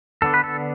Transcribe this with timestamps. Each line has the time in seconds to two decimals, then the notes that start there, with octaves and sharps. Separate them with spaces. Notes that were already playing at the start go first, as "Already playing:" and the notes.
0.22 D3 B3 D4 A4
0.34 B4
0.44 A4